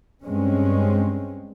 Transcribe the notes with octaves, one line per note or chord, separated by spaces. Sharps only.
G2 G#3 C4 C#4